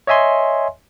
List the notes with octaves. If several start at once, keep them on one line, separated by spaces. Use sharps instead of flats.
C#5 D#5 E5 G#5 C6